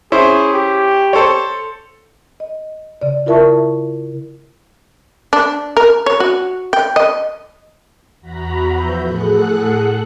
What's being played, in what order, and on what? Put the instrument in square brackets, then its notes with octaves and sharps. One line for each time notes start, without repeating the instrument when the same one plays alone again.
[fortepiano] C#4 E4 C5 [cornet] G#4
[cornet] G4
[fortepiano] A4 C5 C#5
[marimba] D#5
C#3 D5
E4 F4 A#4 E5 A5 C#6
[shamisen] D4
A#4
C#5
F#4
G5
D#5
[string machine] E2 F#4 A#5 B5
E3 F3 B4 E5 G6
A2 G#4 A4 F#5 F#6